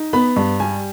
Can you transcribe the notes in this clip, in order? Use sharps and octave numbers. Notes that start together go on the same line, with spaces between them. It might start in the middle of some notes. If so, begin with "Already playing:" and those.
Already playing: D#4
B3 B5
G2
G3 G#5